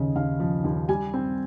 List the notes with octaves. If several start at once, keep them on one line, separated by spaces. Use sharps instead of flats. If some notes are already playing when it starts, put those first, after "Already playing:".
Already playing: D#2 C#3 D#5
D#2 F5
F3
D#2
G3 G#5
C4